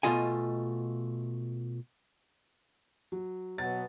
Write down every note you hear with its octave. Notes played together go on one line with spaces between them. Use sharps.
B2 E3 A3 F4 D#5 G#5
F#3
B2 F#3 B3 A6